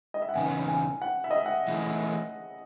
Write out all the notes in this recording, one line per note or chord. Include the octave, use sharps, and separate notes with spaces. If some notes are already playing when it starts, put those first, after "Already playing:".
D#5
E5
F#5
E2 C#3 B3 D#4 G#5
G#5
F#5
E5
D#5
E5
F#5
E3 A3 E4 G#4